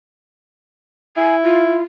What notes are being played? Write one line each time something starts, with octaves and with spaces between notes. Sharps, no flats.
E4 G#5
F4